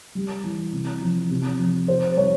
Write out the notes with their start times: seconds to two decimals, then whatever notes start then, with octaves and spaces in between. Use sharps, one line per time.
0.15 G3
0.44 E3
0.73 C3
1.02 F3
1.31 C3
1.59 F3
1.88 C3 C5
2.16 G3 C#5